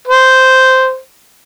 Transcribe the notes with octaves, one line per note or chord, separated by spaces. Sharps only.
C5